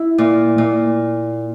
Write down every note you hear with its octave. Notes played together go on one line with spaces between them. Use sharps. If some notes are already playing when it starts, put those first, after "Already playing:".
Already playing: E4
A#2
A#2